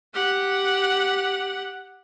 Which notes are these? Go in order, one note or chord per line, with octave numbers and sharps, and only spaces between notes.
G4 F#5